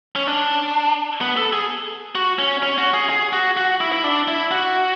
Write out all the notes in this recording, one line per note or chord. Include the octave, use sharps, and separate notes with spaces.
C#4
D4
B3
A4
G#4
F#4
C#4
C#4
F#4
G#4
G#4
F#4
F#4
E4
E4
D4
E4
F#4